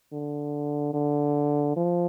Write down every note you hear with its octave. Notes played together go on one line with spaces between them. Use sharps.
D3
D3
F3